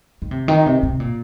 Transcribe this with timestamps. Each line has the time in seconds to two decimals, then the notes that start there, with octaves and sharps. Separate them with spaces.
0.22 D#3
0.31 C3
0.48 D#3
0.66 C3
0.83 C3
1.00 A#2